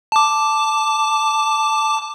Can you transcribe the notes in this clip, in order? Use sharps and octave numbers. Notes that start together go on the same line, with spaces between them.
A5 D6